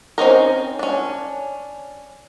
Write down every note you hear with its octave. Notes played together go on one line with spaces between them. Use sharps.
C4 C#4 D#4 A#4
C#4 D4